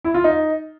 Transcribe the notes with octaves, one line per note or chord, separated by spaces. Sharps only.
E4
F4
D#4